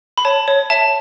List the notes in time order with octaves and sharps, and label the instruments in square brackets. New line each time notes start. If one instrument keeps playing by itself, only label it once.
[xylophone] B5
C#5 A5
C#5
E5 A5